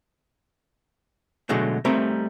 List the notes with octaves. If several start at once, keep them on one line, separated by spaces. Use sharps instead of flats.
B2 D3 F#3 G#3 A3
G3 A3 C4 D#4 A#4 E5